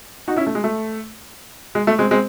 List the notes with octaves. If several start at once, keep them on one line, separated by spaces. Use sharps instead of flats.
D#4 F#4
C#4 E4
A3
G#3
A3
G#3
A3
G#3 C4
G#3 C4